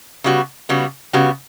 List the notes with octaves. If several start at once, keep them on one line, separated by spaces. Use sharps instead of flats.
C#3 G3 B3 F#4
C#3 G3 B3 F#4
C#3 G3 B3 F#4